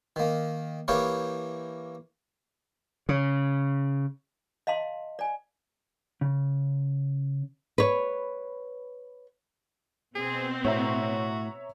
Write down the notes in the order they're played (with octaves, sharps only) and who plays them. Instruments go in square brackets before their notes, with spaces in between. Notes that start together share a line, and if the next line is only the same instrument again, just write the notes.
[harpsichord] D#3 A#3
E3 A#3 E4 G4 A#4 C#5
[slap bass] C#3
[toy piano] D#5 F5 A5 C6
D5 G#5
[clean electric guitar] C#3
[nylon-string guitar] B4 C#5
[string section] B2 C4 [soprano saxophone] G#4
[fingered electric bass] A2 [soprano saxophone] F#4 [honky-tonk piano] C#5 E5 A#5